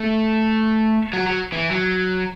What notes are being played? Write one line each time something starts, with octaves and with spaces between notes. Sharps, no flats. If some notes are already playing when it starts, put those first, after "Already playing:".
Already playing: A3
F#3
F#3
E3
F#3